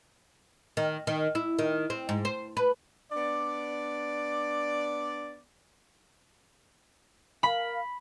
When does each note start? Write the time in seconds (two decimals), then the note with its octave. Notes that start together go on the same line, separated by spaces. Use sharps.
0.77 D#3
1.07 D#3
1.35 E4
1.59 D#3
1.90 C4
2.09 G#2
2.25 C5
2.57 B4
3.12 B3 D4 D5
7.43 A#4 F5 B5